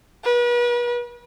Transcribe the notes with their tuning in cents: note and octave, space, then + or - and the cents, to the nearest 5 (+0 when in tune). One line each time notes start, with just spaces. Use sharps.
B4 -40